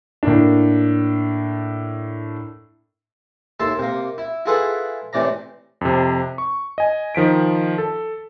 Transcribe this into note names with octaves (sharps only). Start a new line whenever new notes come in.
A2 A#3 D4
D#2 E4 A4 A5 C6
C3 A#3
E4
E4 F4 G#4 A4 B4 F#5
A2 C3 E3 D5 A#5
F2 C3
C#6
D#5 G#5
D#3 F3 B6 D7
A4